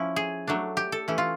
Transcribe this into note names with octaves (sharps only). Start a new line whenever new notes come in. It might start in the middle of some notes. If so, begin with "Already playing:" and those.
Already playing: F3 C#4 E4
G#4
F#3 A3 D4
G4
A4
E3 A3 C#4 E4
F4